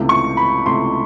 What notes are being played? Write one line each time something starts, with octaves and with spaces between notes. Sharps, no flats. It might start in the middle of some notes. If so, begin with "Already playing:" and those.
Already playing: C#2 C3 E3 A3
C#6
B5
C#2 C3 E3 A3 C6